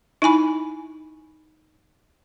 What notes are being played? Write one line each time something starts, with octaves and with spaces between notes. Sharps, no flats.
D#4 E4 G#5 B5